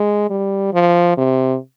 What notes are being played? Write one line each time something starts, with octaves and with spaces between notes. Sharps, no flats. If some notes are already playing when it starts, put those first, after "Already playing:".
Already playing: G#3
G3
F3
C3